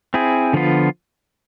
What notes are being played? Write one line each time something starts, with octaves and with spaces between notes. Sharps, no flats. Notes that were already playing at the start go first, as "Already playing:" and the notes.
C4 E4 G#4
D3 F3 B3 F4